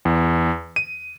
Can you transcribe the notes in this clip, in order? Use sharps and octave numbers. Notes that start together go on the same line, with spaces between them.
E2
D#7